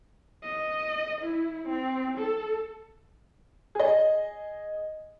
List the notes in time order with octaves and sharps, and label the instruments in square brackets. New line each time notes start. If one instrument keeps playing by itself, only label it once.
[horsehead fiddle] D#5
E4
C4
A4
[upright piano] G#4 D#5